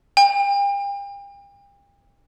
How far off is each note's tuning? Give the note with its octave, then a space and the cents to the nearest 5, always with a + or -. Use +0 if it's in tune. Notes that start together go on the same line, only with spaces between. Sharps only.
G5 +40